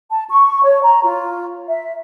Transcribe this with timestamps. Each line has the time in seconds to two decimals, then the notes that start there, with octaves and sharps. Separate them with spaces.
0.12 A5
0.28 C#6
0.63 C#5
0.83 A#5
1.03 F4
1.68 E5